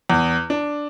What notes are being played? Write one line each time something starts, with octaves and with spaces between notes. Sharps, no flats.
E2
D4